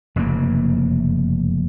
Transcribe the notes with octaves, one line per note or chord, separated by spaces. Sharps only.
F1 F#2 C#3 A#3